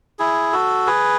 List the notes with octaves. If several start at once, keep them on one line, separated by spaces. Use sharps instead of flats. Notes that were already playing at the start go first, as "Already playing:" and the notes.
E4 G#4
F#4 A4
G#4 B4